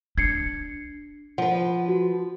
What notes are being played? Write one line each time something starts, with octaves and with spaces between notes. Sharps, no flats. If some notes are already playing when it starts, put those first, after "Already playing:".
D4 G#6 C7 C#7
F3 B4 F#5
F#4